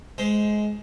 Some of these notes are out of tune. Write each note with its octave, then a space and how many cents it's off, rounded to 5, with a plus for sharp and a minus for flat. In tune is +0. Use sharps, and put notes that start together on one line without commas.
G#3 +20 C5 -10